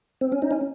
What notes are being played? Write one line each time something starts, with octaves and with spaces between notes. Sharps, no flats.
C4
C#4
D#4
C#4